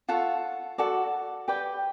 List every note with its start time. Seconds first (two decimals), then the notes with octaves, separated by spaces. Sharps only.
0.09 F4 A4 C#5 F#5
0.78 F#4 A4 D5
1.48 G4 B4 D5 G5